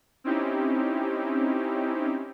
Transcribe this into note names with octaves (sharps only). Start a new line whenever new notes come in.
C4 C#4 D#4 E4 G4